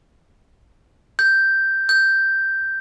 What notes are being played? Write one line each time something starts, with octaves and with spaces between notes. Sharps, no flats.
G6
G6